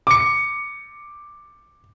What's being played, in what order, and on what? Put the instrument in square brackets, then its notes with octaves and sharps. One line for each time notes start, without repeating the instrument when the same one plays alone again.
[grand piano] D6 C#7